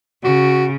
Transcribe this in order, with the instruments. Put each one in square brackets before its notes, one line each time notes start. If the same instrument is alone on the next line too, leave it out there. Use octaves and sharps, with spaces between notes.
[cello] C#3 [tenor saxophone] F#4